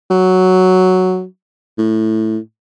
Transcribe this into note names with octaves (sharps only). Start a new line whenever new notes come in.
F#3
A2